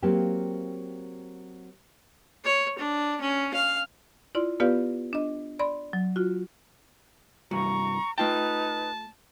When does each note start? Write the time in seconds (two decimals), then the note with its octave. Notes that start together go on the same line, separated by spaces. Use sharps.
0.02 F#3 A#3 C4 F4 G4
2.44 C#5
2.79 D4
3.21 C#4
3.54 F5
4.35 E4 F4 D5 C6
4.60 B3 F4 G4 B4 D5 F5
5.13 D4 D#5
5.59 D5 B5 C6
5.93 F#3
6.16 F4 F#4
7.51 C2 G2 F#4 A#5 C#6
8.18 A3 D#4 F4 B4 G5 A5